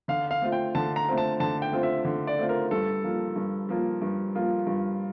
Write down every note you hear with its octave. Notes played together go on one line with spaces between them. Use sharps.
D3 F5
F5
A3 C4 F4
G5
D3 A5
A#5
A3 C4 F4
A5
D3 A5
G5
A3 C4 F4
E5
D3
D5
A3 C4 F4
A#4
G2 A4
F3 A#3 F4
G2
F3 A#3 F4
G2
F3 A#3 F4
G2